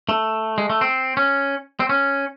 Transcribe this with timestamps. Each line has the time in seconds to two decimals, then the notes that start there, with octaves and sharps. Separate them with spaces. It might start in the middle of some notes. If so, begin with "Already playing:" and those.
0.09 A3
0.58 G#3
0.70 A3
0.81 C4
1.17 C#4
1.80 C4
1.89 C#4